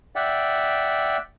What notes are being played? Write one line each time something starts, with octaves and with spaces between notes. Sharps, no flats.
D5 E5 F#5 G5